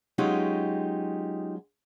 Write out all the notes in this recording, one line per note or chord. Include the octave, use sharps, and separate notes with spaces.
F#3 G#3 C#4 D#4 F4 G4